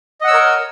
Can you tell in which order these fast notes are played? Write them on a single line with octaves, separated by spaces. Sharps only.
D#5 F#5 E6 C#5 A#4